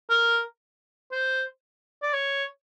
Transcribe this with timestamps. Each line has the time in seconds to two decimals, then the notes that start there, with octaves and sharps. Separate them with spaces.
0.10 A#4
1.12 C5
2.03 D5
2.14 C#5